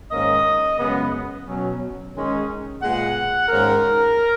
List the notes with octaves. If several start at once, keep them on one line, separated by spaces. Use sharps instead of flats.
G#2 D#3 A#3 C#4 D#5
F#2 C#3 G#3 B3
B2 F#3 C#4
D#3 G#3 C#4
A#2 G#3 B3 F#5
G#2 D#3 A#3 C#4 A#4